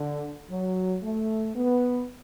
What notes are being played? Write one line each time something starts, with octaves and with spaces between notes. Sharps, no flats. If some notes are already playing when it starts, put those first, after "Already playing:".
Already playing: D3
F#3
A3
B3